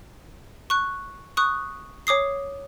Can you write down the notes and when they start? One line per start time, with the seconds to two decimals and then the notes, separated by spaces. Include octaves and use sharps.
0.70 C#6 F#6
1.37 C#6 D#6 F#6
2.07 C#5 D6 D#6 C7